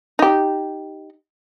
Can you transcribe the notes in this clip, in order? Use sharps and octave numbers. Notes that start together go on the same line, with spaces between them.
D#4 G4